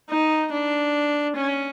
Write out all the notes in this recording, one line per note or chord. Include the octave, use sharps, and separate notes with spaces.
D#4
D4
C#4